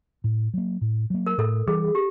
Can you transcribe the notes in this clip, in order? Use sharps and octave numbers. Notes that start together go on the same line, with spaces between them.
A2
F#3 A#3
A2
F#3 A#3
A#4
A2 A4
E3 G3 G#4
G4